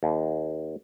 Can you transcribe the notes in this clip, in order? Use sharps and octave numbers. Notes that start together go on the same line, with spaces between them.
D#2